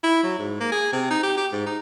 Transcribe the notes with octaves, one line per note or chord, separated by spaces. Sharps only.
E4
F#3
G#2
A#3
G#4
C3
D#4
G4
G4
G#2
D#4